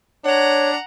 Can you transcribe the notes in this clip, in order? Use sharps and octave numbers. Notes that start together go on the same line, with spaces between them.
D4 C#5 F#5 A#5